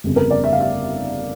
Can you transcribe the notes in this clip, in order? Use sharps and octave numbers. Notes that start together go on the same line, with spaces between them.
G1 F2 C#3
A#4
D5
E5
F5
E5